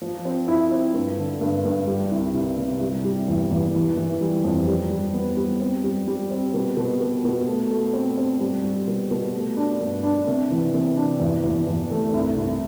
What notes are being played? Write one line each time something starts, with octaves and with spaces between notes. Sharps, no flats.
F3
C4
E4
C4
G2
D3
G2
G2
G3
C2
C2
C3
G3
G3
E2
E2
E3
E3
G3
F2
G3
G3
B3
G3
C4
G3
G3
C4
B2
B2
B2
B2
A3
A3
C4
C4
G3
G3
B2
B2
A3
D4
G2
D4
C3
E3
C3
D4
E2
E2
E2
A3
C2
C2